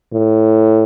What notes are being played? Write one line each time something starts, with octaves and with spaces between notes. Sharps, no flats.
A2